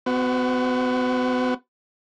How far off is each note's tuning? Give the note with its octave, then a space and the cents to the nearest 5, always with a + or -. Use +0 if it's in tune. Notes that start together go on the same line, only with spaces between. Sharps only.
B3 +40 F#4 +0